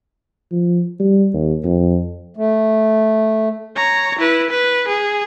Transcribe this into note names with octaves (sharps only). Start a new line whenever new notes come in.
F3
G3
D#2
F2
A3
C#5 A#5
E4 B4
B4
G#4